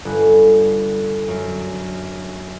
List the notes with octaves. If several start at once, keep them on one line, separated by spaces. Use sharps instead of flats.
G1
F#2